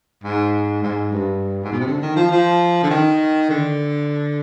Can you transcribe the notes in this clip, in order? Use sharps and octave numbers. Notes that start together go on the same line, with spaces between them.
G#2
G#2
G2
G#2
B2
C3
D3
D#3
F3
F3
D3
D#3
D3